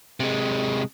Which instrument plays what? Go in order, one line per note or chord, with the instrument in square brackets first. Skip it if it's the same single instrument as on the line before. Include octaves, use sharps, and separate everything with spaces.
[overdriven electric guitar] C3 G#3